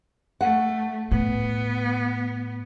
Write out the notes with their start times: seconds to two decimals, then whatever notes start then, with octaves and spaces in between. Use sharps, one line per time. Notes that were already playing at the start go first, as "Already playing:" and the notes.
0.41 A3 F#5
1.11 A2 B3